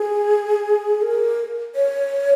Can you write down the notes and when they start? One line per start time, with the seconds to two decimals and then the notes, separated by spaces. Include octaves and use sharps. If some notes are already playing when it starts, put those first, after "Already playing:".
Already playing: G#4
1.02 A#4
1.75 C#5